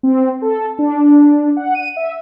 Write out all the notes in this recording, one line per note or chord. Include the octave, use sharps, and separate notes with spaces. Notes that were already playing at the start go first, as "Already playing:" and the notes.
C4
A4
D4
F#5
D#7
E5